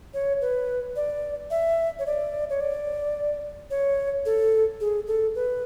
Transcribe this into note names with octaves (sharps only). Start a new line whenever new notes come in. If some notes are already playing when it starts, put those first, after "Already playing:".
C#5
B4
D5
E5
C#5
D5
C#5
D5
C#5
A4
G#4
A4
B4